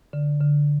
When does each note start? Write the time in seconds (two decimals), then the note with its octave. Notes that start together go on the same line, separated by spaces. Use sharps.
0.13 D3
0.41 D3